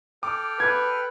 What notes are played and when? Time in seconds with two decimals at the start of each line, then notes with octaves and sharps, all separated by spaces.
0.23 A4 G5 D6 F6
0.60 B4 G#6